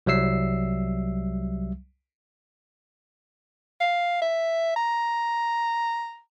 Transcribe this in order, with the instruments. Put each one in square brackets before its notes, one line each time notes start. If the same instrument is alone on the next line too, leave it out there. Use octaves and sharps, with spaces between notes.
[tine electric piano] C2 F#3 G3 E5 E6 C7
[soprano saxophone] F5
E5
A#5